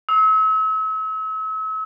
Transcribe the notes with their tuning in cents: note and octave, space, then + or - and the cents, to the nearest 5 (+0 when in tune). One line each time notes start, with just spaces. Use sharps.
E6 -40